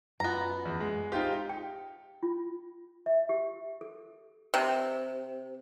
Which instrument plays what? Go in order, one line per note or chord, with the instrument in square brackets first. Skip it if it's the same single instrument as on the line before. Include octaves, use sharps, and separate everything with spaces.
[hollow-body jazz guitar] F#2 F4 [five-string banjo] B3 A#5
[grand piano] E2
G#3
[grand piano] D#4 F4 G4 [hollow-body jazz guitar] C5 G5
[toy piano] G5
F4
E5
G4
A4
[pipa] C3